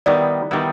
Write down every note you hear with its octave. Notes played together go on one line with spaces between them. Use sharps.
D#3 G3 B3 E4 D5
D#3 G3 B3 E4